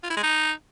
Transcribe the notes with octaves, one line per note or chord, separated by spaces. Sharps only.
F4
E4
G#3
D#4